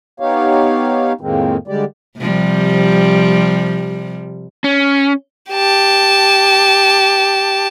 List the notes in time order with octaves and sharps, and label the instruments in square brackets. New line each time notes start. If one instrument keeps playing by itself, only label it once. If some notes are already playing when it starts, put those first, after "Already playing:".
[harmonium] B3 D#4 G4 C#5 F5
F2 A2 D#3 G#3 A#3 C4
D3 G3 G#3 G4 D5
[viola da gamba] C3 F3 G3
[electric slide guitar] C#4
[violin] G4 A5